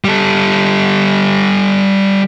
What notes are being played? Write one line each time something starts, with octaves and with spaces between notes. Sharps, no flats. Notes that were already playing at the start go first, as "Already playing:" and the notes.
G3 A4